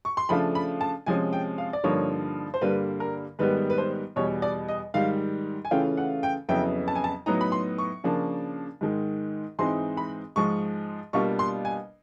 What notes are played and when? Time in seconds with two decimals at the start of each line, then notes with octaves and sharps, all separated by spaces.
0.05 C#6
0.17 C6
0.29 C#3 F3 A3 D4 F4 B5
0.55 B5
0.81 A5
1.06 C3 F3 G#3 C#4 G#5
1.33 G5
1.58 F5
1.73 D5
1.84 G2 D3 F3 A#3 D#4 C#5
2.54 C5
2.61 G2 D3 G3 A#3 B4
3.00 A#4
3.39 G#2 D#3 G3 B3 B4
3.70 B4
3.78 C5
4.16 E2 B2 G3 C#5
4.42 D5
4.68 D#5
4.94 G#2 D#3 G3 F5
5.65 G#5
5.71 C#3 E3 A3 C#4 F4 G5
5.97 F#5
6.23 G5
6.49 F2 C#3 F#3 B3 E4 G5
6.88 A5
6.95 G#5
7.04 A5
7.26 A2 F#3 B3 D#4 A#5
7.41 B5
7.52 C6
7.78 C#6
8.04 C#3 F3 A#3 D4
8.81 G#2 D#3 G#3
9.59 G#2 E3 G#3 C4 D#4 C6
9.97 B5
10.36 G#2 F3 G#3 C#6
11.13 B2 G3 A#3 D4 F4 C#6
11.39 C6
11.65 G#5